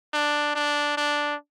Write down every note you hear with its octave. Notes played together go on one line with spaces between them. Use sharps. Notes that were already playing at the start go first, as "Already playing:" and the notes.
D4
D4
D4